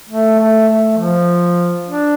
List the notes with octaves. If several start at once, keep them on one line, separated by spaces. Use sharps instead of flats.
A3
A3
A3
F3
D4